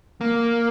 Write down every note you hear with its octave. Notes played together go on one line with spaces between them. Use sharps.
A#3